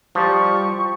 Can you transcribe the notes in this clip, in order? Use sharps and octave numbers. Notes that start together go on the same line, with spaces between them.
F3 G3 C#6